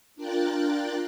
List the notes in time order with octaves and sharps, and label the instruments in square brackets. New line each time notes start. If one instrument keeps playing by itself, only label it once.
[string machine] D4 F4 A#4 G5 F#6 A6